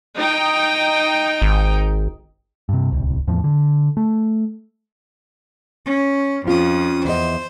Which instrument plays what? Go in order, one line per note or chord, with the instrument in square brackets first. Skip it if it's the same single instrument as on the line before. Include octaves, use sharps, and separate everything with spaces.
[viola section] D#4 G5
[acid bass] G#1
[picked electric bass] G2 C3
D1 C2
E2 A2 F3
D3
A3
[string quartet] C#4
[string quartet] F2 D#6 [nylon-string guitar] C#4 F4
[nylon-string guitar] E2 D#5 [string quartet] C5